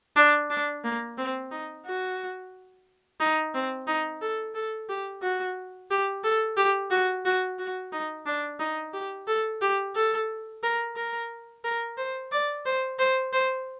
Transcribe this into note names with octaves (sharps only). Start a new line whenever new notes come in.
D4
D4
A#3
C4
D#4
F#4
D#4
C4
D#4
A4
A4
G4
F#4
G4
A4
G4
F#4
F#4
F#4
D#4
D4
D#4
G4
A4
G4
A4
A#4
A#4
A#4
C5
D5
C5
C5
C5